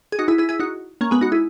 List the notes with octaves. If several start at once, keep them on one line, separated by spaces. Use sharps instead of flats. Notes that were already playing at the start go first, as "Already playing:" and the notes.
G#4
D#4 F#4
E4 G#4
E4 G#4
E4 G#4
D#4 F#4
A#3 C#4
G#3 B3
D#4 F#4
E4 G#4